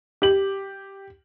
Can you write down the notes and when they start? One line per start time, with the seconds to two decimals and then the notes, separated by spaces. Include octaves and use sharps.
0.22 G4 F#7